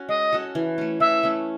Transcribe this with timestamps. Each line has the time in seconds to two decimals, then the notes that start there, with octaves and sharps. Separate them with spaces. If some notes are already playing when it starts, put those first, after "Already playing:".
Already playing: C#4 F#4
0.09 G#3 D#5
0.33 C#4 F#4 A4
0.55 E3
0.78 A3 C#4
1.00 E3 E5
1.23 A3 C#4